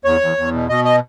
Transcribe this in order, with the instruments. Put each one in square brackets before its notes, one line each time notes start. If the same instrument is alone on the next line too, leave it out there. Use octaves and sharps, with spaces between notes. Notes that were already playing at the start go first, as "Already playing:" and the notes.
[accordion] E2 C#5
E2
E2
B2
B2 D#5
D#5